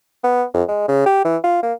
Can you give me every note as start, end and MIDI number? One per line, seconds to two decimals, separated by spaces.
0.24 0.44 59
0.54 0.63 41
0.68 0.86 56
0.88 1.06 49
1.06 1.25 67
1.25 1.37 52
1.44 1.61 65
1.63 1.73 58